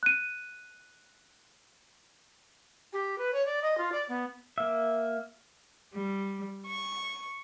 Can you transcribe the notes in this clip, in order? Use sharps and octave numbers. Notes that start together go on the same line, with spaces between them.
F#6 D#7
G4
B4
C#5
D5
D#5
F4
D5
B3
A#3 E5
G3
C#6